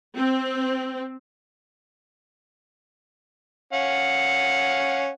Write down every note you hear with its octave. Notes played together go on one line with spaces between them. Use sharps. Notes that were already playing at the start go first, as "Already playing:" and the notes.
C4
C#4 F5 F#5